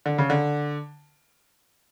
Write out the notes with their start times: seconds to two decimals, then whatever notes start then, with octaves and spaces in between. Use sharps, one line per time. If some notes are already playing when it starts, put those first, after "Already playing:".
0.06 D3
0.18 C#3
0.30 D3